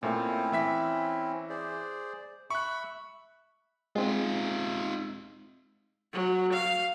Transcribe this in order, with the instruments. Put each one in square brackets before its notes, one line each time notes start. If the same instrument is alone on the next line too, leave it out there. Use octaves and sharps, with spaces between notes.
[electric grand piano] A#2 A3 [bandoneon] C4 C#4 E4
[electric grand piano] E3 E5 B6
[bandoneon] G#4 C5 D5
[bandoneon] E5 B5 E6 [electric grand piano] C#6 F#6
[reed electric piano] G#3 C4 [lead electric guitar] D#4 F4
[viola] F#3
F5